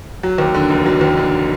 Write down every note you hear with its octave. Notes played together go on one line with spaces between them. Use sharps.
F#3
D#2
D3
F1
F#3
D#2
D3